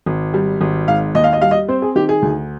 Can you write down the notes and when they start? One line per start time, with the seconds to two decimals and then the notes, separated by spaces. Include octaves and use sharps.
0.06 G#1
0.34 G3
0.61 G#1
0.87 G#2 F5
1.15 D#2 D#5
1.24 F5
1.33 D#5
1.41 G3 F5
1.51 D#5
1.68 C4 C5
1.82 G#4
1.95 D#3 G4
2.09 G#4
2.22 D2